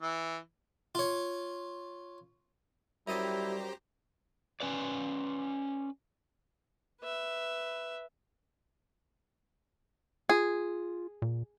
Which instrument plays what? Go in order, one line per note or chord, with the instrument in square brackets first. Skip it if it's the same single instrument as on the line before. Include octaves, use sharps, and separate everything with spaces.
[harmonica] E3
[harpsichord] F4 C#5
[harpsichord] F#2 D#5 A5 [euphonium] G3 [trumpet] E4 [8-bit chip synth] G4 C5 A#5
[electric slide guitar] C#4 B4 D5
[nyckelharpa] B4 E5
[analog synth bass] F4 [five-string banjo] G#4
[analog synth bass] A#2